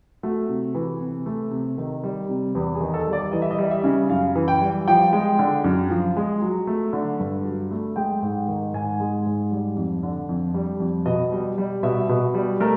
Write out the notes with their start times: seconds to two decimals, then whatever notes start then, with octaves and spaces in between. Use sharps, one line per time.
0.23 A3 F#4
0.49 C3
0.75 E3
1.01 C3
1.26 A3
1.51 C3
1.78 D#3
2.04 G3
2.29 C3
2.55 E2 G4
2.75 G#4
2.81 D#3
2.94 A4
3.07 G3
3.13 D5
3.32 E3 D#5
3.42 E5
3.51 D#5
3.58 G3
3.71 E5
3.84 C#3
4.10 F#2 F5
4.35 E3
4.48 G5
4.62 G3
4.87 F3 G5
5.13 G#3
5.39 D3
5.64 F#2
5.90 F3
6.17 G#3
6.42 F#3
6.67 A3
6.93 D3
7.20 G2
7.45 F#3
7.71 A3
7.96 G#3 G5
8.22 G#2
8.48 D#3
8.74 G#2 G#5
9.00 G#3
9.26 G#2
9.51 G3
9.77 F2
10.03 D3
10.29 F2
10.54 G3
10.80 F2
11.06 B2 D#5
11.32 G3
11.58 G3
11.83 B2 E5
12.09 B2
12.34 G3
12.60 A3 A#4